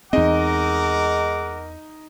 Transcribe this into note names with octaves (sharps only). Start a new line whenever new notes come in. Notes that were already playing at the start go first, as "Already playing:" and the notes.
E2 G#3 C4 D#4 A#4 D#5 F#5 D6